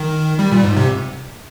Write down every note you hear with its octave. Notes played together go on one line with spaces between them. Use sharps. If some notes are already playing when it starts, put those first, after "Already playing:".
Already playing: D#3
G3
A#2
G#2
C3